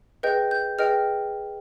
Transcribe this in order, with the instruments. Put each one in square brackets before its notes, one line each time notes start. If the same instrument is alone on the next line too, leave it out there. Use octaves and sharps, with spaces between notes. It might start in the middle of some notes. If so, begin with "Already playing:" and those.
[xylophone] G#4 B4 D#5 G5 G6
G6
G#4 B4 D#5 G5 F6